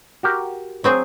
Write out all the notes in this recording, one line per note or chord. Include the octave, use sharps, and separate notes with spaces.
F#4 G4 A#4
F#3 C4 G#4